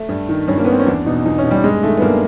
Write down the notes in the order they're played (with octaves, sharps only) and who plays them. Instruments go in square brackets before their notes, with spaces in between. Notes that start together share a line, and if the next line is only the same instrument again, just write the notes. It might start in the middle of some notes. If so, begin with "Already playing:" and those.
Already playing: [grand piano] A3
G2
D#3
G2 C#4
A#3
D#3 B3
C4
C#4
E2 D4
B2 D#4
E2 D#4
C#4
B2
G3
G2 G#3
D#3 A3
B3
G2 A#3